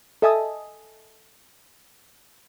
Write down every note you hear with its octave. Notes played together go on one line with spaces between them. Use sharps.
A4 D#5 E5 G#5 A5 D#6